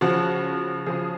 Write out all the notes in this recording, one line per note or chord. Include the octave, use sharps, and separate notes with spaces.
C#3 F3 F#4
C#3 F3 G#4